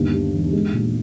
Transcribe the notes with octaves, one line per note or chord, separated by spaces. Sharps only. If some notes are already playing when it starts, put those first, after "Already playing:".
Already playing: G1 D#2
G3
E1
G#3
A#2